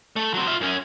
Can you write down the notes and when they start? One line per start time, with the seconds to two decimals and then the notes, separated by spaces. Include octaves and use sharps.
0.16 A3
0.34 F#3 C4
0.47 F4 E5
0.61 F#2 C#4